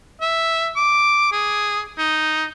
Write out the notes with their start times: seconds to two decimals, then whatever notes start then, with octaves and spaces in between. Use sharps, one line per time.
0.21 E5
0.76 D6
1.32 G#4
1.98 D#4